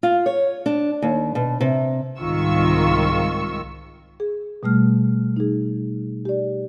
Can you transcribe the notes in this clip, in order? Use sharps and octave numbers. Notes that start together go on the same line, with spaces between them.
F4
C#5
D4
D#2
B2
C3
C2 G#2 D#3 F4 C#6 E6
G#4
B2 G3 A3 F6
D#4 G#4
G4 D5